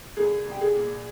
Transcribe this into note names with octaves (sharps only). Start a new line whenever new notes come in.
C2 G#4
C2
G4
G#4
A#2